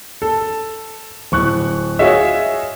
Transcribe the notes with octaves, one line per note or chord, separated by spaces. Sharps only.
A4
D1 C#6 F#6
F4 F#4 G#4 C#5 D#5 E5